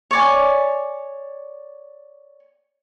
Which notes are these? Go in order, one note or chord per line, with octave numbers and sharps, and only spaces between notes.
C#5 D5 G#5